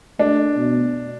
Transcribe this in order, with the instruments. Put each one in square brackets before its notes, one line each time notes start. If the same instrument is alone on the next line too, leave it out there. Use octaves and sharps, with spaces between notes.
[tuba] A3 [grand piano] D4
[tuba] B2